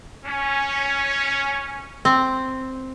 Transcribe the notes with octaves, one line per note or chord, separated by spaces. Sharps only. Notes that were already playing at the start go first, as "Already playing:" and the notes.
C#4
C4